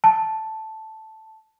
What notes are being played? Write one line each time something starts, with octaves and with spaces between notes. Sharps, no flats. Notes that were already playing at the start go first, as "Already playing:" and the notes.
A5